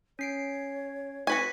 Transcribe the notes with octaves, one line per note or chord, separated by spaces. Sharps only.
C#4 C#5 C7 D7
C4 F#4 B4 G#5 C#6 B6 C#7